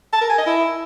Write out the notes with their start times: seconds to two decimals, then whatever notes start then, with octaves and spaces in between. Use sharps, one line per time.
0.13 A5
0.21 A#4
0.29 G#5
0.38 D#5
0.46 E4